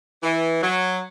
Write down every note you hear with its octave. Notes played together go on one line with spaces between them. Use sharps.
E3
F#3